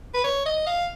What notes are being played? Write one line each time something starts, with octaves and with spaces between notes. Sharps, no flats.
B4
C#5
D#5
F5